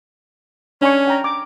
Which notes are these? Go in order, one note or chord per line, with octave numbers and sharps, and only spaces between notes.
C#4 D4 G#5 C#6
G5 A#5
D6